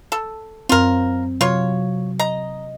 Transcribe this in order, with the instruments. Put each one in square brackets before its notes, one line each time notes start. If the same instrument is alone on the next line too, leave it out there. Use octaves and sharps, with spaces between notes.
[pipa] A4
[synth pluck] F#2 C4 [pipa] F4 A#4
[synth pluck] C3 F#3 [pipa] F4 C#5
[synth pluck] D#5 [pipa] A#5